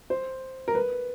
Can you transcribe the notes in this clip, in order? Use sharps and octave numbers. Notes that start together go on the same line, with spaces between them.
C5
A#4
B4